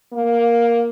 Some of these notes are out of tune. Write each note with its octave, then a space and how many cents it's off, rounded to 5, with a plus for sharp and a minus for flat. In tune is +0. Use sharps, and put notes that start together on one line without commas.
A#3 +5